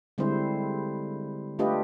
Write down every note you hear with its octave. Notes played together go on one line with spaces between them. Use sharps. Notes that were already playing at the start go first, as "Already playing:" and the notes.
D3 G3 G#3 C4 E4 C5
A3 D4 F4 G4 B4 D#5